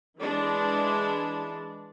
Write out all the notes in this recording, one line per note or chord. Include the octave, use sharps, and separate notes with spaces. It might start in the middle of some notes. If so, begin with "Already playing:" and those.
E3 G#3 D4